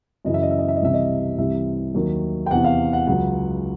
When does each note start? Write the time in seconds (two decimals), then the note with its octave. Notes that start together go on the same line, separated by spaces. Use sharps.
0.25 F#2 C#3 E3 D#5
0.34 E5
0.43 D#5
0.51 E5
0.59 D#5
0.68 E5
0.76 D#5
0.81 C2 C3 E3 G3 E5
0.94 D#5
1.38 C2 C3 E3 G3 E5
1.94 D#2 D#3 F#3
2.46 G5
2.51 E2 C3 E3 F#5
2.64 F5
2.93 F#5
3.07 C#2 C#3 F#3 F#5